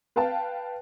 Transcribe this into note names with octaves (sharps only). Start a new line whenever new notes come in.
B4 F5 G5 A5